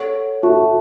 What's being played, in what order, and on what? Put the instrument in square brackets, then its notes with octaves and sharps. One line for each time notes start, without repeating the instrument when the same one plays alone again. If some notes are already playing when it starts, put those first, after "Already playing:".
Already playing: [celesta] A4 C#5 F#5 C#6
[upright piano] F#4 [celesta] A4 E5 A5 C#6